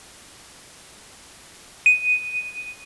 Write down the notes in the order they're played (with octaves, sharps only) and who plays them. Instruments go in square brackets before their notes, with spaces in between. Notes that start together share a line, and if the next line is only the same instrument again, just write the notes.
[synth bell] D#7